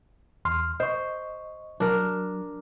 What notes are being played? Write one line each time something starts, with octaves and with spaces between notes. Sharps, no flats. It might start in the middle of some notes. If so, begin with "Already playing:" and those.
E2 C6 F6
C5 D#5 C#6
F#3 D4 A#4